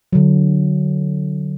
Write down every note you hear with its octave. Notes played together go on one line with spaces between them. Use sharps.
D3 F#3